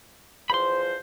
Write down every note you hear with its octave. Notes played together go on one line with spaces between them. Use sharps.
E2 F3 C5 B5 C6